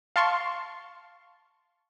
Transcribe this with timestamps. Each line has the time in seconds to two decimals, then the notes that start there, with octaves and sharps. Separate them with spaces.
0.16 F5 A5 C6 C#6